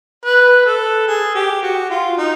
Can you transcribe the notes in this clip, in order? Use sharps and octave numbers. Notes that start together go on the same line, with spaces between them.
B4
A4
G#4
G4
F#4
F4
D#4